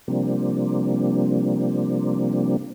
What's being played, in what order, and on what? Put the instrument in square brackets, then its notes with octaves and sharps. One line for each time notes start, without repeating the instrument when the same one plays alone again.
[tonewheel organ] C3 F3 G3 A#3 C4 D4